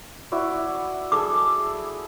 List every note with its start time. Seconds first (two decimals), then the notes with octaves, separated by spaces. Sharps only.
0.32 E4 F#4 D5
1.12 G#4 A4 D6 E6